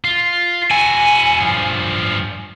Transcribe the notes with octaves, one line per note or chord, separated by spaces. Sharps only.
F4
E4 F#4 G#5
G2 F3